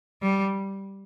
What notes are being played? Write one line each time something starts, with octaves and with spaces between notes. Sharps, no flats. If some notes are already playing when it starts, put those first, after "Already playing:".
G3